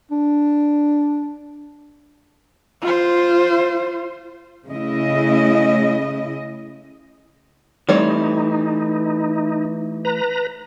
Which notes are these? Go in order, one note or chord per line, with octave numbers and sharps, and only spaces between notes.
D4
F4 C5
C#3 A3 E4 D#5
E3 G3 A3 C4 D#4 C#5
B4 A#5